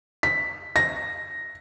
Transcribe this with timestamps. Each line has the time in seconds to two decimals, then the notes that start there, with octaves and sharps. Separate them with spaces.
0.23 B6
0.76 A#6